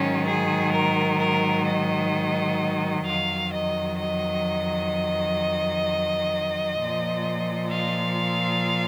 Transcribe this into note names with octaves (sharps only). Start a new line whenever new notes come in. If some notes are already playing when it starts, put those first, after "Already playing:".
Already playing: G#2 D#3 F#3 C#4
G#4
A#4
A#4
D#5
F2 D#3 F#3 F5
D#5
D#5
A#2 F3
F5